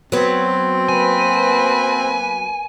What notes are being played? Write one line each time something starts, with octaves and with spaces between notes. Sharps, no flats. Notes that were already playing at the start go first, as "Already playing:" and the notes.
F#3 B3 C4
A#3 B4 G#5